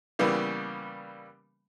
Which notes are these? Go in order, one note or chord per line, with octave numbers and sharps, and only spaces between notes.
C#3 E3 G3 A#3 B3